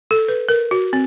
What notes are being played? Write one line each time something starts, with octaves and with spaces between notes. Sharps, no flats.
A4
B4
A#4
F#4
C4